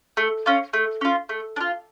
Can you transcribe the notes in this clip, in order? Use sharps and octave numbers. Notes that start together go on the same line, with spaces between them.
A3
C#4 F4
A3
C#4 F4
A3
D4
F4